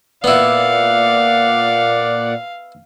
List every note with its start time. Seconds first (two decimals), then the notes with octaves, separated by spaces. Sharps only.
0.24 A#2 B3 E4 D5 F5 F#5